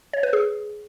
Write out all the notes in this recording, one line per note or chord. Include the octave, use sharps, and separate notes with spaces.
C#5
B4
G#4